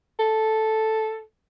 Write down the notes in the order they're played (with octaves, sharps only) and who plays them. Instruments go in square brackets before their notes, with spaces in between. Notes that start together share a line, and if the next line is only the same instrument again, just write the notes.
[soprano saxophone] A4